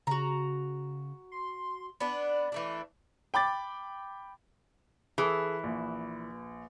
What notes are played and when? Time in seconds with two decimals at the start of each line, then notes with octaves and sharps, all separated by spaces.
0.07 C#3 F#4 A#5
1.32 C6
2.00 B3 D4 D5
2.52 E3 A3 D4
3.34 G5 B5 D6 A6
5.18 E3 G#4 A4
5.63 A#1